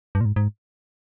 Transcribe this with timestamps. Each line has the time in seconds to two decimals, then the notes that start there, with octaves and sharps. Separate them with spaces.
0.15 G2
0.21 A#2
0.25 G#2
0.36 G#2